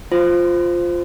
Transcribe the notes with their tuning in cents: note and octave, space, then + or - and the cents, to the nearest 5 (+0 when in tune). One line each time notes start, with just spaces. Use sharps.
F4 +0 C5 -5